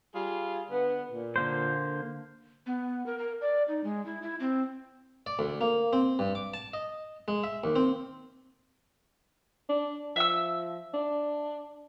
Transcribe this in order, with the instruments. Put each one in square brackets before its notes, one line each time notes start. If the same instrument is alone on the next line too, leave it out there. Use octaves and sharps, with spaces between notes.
[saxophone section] G3 F4 G#4
D3 B3
A#2
[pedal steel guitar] D3 A#3 C5
[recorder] B3
A#4
A#4
D5
D#4
G#3
E4
E4
C4
[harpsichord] D5
D2
A#3
C4
G2
D6
A5
D#5
G#3
E5
D#2
C4
[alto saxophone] D4
[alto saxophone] F3 [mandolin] E5 E6
[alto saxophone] D4